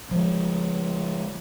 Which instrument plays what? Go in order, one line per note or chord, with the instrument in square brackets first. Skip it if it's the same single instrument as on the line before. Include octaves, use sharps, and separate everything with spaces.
[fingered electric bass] F3 G#3